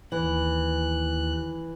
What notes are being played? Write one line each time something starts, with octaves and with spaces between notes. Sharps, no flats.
D#2 E3 F#6